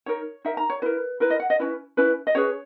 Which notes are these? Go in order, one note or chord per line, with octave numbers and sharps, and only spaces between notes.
D#4 A#4 C#5
D#4 A#4 E5
A#5
C#5
E4 A#4 B4
E4 A#4 B4
D#5
F#5
D#5
C#4 E4 B4
C#4 E4 B4
D#5
C#4 G#4 B4 C#5